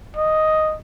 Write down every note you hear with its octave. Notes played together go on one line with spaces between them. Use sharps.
D#5